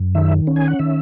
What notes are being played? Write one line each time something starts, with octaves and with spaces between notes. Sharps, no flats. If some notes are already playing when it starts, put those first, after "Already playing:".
Already playing: F#2
D#3 E5
C#4
G#5
F#5
D#3 E5